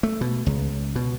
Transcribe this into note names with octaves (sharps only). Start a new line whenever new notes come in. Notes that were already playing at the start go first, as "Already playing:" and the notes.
A3
B2
C#2
B2